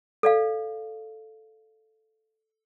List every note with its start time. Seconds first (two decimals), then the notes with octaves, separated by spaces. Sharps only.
0.23 A4 D5 F5